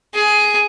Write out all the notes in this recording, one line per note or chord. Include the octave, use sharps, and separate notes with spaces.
G#4